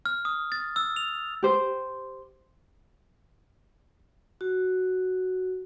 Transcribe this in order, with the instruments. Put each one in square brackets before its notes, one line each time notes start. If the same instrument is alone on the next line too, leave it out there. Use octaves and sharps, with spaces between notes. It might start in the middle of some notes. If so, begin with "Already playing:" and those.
[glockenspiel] F6
D#6
A6
E6
F7
[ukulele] G4 C5
[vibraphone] F#4